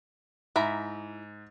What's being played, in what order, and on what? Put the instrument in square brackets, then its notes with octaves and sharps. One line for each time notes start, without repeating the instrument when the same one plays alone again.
[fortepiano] G#2 [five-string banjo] E4 E5 A#5